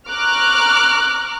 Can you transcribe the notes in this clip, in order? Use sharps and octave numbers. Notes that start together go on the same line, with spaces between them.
A#5 C#6 D6 F6 F#6